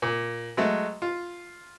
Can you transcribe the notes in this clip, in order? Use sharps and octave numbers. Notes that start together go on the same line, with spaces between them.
A#2
F#3 G#3 A3
F4